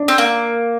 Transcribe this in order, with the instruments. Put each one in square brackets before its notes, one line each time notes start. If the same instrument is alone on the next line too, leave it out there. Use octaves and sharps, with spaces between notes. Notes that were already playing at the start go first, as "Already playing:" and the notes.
Already playing: [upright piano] D4
[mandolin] C4
A#3